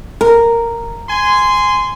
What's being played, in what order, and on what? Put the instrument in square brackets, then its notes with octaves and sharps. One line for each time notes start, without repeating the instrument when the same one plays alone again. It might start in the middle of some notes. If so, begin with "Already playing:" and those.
[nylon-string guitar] A#4
[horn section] G#5 C6